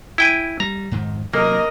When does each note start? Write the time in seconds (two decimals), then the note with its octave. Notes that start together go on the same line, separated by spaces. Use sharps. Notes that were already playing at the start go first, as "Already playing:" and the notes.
0.18 E4 G5 G#5
0.60 G3 A#5
0.92 F2 G#2 D#3
1.34 C3 F#3 A#3 A#4 D#5